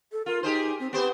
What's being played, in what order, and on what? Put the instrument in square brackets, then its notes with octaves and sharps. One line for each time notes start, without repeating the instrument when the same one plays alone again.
[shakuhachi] A4
[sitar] F4 [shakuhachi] A#4
[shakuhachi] D#4 [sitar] G4 G#4 C5
[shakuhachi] C4
[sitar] B3 C5 [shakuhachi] G4